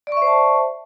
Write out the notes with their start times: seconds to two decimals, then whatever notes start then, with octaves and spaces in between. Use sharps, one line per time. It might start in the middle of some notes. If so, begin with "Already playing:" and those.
0.07 D5
0.12 C#6
0.17 E5
0.22 C5
0.27 A5